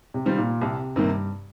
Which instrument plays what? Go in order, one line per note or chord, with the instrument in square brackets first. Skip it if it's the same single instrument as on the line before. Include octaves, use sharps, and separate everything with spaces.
[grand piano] C3
[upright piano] D#3 G3 C4 F4
[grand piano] A#2
[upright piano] C2 [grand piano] C3
[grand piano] G2 [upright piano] C3 D#3 A#3